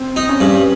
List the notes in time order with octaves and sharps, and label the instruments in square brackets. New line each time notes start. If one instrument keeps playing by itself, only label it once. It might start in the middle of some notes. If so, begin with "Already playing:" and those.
Already playing: [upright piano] C4
[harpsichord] D#4
[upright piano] C#4
[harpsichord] G2 [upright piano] C#4